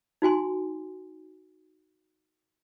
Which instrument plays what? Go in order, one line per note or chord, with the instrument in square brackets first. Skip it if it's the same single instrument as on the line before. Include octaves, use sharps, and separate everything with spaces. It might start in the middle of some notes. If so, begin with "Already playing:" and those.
[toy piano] D#4 F#4 G#5 C6